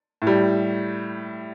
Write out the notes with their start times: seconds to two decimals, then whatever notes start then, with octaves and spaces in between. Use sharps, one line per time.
0.22 A2
0.27 G3